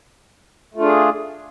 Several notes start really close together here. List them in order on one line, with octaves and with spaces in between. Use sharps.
A3 F4 D4 G#4